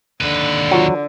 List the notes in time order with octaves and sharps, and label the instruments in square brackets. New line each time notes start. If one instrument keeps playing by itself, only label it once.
[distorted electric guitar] D#2 B4 [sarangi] D3
[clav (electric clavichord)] F#3 [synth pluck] F4 F#5